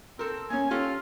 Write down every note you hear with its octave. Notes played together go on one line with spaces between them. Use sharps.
C4 A4 A#4
A#3 C#4 G#5
C#4 F4 G4 A4